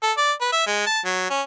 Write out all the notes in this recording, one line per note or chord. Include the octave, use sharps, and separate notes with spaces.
A4
D5
B4
E5
G#3
A5
F#3
C#4